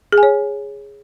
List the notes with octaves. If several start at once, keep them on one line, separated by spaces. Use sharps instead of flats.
G#4
G#5
C#5